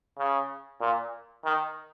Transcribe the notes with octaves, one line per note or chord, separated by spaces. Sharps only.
C#3
A#2
D#3